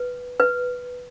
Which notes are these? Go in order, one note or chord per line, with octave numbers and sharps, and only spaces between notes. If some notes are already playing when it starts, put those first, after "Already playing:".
Already playing: B4
B4